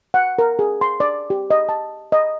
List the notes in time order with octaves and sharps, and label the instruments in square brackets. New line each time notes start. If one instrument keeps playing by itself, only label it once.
[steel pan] F#5
A#4
G#4
C6
D5
G4
D#5
A5
D#5